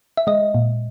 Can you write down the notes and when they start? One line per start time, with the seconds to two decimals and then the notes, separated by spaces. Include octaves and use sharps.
0.17 E5
0.27 G#3 D#5
0.55 A#2